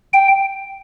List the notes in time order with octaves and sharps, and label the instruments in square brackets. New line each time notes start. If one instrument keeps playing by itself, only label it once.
[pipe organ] G5